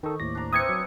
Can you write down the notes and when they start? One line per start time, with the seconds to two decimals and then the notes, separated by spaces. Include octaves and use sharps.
0.03 D#3 D#4 A4 C#6
0.20 D#2 A2 D5 A#6
0.35 D4 A#5
0.53 C4 E4 B4 D#6 G#6 C#7
0.69 F#3